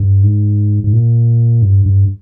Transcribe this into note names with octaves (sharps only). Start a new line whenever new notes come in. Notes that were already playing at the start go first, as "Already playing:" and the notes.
Already playing: G2
G#2
G#2
A#2
G2
G2